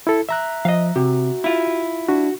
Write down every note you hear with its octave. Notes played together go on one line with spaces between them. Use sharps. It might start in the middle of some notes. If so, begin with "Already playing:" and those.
E4 A4
E5 A#5 F#6
F3 D#5 F5
C3 F#4
E4 F4
D4 F#4